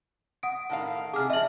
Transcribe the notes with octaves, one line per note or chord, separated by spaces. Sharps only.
F#5 D#6 D7
A2 D#3 F5
C3 G#4 D6 F6
F3 D#5 E5 F#7